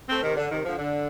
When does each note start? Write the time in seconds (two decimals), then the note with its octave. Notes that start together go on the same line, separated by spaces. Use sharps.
0.09 A3 C4
0.23 C3 D#3
0.37 D3
0.51 C3 D#3
0.65 D3 F3
0.79 D3